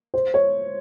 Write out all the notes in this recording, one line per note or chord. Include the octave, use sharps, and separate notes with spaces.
C5
C#5